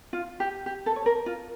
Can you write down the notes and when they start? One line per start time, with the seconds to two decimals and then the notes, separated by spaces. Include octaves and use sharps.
0.13 F4
0.40 G4
0.66 G4
0.86 A4
0.96 C#5
1.06 A#4
1.26 F4